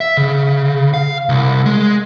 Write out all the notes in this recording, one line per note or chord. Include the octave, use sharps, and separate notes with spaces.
E5
C#3
F5
C2
G#3